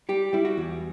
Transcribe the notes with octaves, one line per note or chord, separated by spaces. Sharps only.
G3 G4
G3 E4
F#4
E2